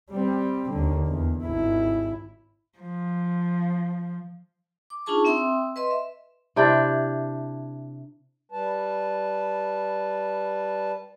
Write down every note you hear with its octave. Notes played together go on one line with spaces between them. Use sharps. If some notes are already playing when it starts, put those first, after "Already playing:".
G3 C4
D#2 D3
E2
G#1 E4
F3
D6
D4 D#4 F4 G#4 A5 C#6
C4 E5 G5 C6 D#6 E6
B4 D#5 C6
E5
C3 D4 E4 G5
G3 B4 A5